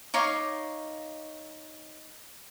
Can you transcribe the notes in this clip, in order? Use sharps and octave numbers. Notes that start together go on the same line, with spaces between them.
D#4 C#5 F5 D6